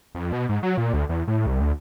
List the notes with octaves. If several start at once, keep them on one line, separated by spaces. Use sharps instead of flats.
F2
B2
G#2
F#3
A#2
D2
E2
A2
C2
D2